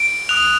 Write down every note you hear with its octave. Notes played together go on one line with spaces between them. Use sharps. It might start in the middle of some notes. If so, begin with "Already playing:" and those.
Already playing: D7
D#6 F#6 F7